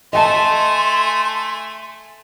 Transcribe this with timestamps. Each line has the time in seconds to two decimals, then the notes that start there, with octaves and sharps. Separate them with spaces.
0.13 A3 D#5 F#5 G#5 A5 C6